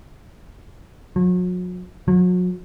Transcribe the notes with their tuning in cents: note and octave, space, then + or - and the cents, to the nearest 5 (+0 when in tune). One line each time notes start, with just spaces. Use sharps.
F#3 -40
F#3 -35